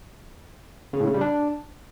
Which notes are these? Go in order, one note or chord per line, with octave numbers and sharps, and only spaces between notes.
C#3
A2
C#3
G3
D4